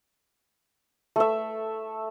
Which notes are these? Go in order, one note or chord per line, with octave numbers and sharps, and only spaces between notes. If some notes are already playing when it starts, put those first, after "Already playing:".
A3 E5